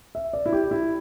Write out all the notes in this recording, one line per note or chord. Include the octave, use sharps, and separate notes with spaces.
E5
D5
E4
G4
E4